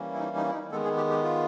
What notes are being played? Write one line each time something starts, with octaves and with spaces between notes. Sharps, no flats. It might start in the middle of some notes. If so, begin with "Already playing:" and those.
Already playing: E3 G3 A#3 C#4
E4
D#4
D#4
E4
D#4
D#3 G#3 B3 A4
G#4
G4
G4
F4